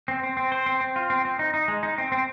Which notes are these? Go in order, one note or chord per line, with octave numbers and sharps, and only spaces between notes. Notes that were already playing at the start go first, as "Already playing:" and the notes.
C4
C4
C4
C5
C4
C4
F4
C4
C4
D#4
D#4
G#3
D#4
C4
C4